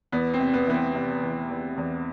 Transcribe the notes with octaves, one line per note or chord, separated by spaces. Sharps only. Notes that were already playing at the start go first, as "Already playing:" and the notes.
E2 B3
C4
C3
B3
E3 B3
C4
C3
E2
E2
E2